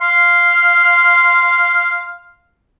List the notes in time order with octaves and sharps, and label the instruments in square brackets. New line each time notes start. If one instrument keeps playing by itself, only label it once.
[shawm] F5 [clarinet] C6